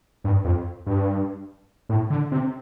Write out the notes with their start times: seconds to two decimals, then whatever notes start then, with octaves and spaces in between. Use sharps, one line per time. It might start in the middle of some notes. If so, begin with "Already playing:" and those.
0.24 G2
0.44 F2
0.86 G2
1.89 A2
2.10 D3
2.32 C3